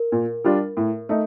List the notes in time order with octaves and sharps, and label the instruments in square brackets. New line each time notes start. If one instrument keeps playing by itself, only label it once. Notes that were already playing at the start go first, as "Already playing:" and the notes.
Already playing: [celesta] A#4
[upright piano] A#2
G3 D4 F4
A2
A3 D#4